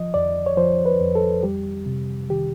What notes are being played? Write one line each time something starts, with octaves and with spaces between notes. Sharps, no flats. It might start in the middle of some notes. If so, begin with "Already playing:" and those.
Already playing: F3 D#5
F2 D5
C#5
F3 C5
B4
F2
A4
G3 G4
C3
D#3 G4